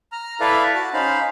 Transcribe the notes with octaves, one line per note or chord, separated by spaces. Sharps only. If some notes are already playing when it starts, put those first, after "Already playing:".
A#5 F6
E4 A4 B4 D5 E5 F5
F#4 A5
C#4 D#4 C5 F5 B5